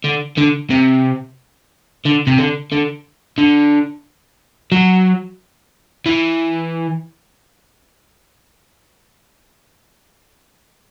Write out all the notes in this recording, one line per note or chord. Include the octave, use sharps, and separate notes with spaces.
D3
D3
C3
D3
C3
D3
D3
D3
F#3
E3